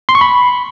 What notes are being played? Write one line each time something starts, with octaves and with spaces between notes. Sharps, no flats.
C6
C#6
B5